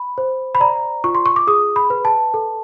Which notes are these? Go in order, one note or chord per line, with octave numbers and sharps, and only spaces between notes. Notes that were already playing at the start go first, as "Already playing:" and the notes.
Already playing: B5
C5
B5
D5 A#5
F4 C#6
C6
C#6
D6
G#4 D#6
B5
B4
A5
A4